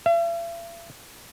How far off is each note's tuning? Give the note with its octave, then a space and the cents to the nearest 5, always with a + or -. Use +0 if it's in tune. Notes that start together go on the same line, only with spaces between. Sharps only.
E5 +45